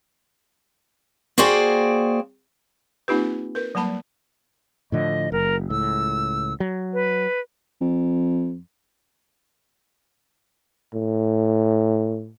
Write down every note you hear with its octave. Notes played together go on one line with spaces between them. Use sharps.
A#3 F#4 G#4 C5 D5 G5
A#3 C4 D#4 F4 G4 B4
A#4 B4
F#3 G3 A#3 A5 B5
A2 D3 F3 D#5
F#1 A#4
C#2 A2 E6
F#3
B4
F2
A2